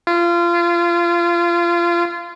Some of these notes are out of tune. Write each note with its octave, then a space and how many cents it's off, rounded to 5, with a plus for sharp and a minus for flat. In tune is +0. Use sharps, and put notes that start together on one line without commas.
F4 -25